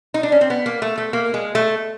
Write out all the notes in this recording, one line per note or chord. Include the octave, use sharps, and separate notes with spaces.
D#4
D4
C#4
C4
B3
A#3
A3
A3
A#3
G#3
A3